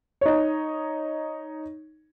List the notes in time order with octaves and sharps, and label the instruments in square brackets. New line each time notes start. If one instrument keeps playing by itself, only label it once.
[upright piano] D#4 C#5